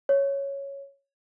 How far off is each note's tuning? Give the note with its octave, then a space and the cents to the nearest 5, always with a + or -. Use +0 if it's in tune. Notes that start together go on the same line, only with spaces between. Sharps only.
C#5 +0